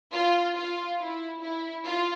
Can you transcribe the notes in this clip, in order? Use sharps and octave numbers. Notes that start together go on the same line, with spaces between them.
F4
F4
E4
E4
F4